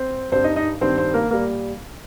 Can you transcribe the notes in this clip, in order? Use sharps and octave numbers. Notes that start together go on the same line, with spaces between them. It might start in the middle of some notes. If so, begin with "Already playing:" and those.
Already playing: C4 C5
G2 G3 C4 C5
D#4 D#5
D#4 D#5
G2 D#3 G3 C4 C5
C4 C5
A#3 A#4
A#2 G3 A#3 A#4